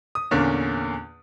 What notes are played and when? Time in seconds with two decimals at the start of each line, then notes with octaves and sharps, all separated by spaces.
0.15 D#6
0.31 E2 A#2 D3 A#3 C#4